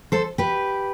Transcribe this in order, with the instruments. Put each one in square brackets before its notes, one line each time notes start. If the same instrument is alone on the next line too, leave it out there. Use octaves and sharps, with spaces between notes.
[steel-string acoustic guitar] A4 C5
G4 B4